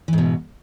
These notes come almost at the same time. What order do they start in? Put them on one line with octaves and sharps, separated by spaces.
E3 G#2 B2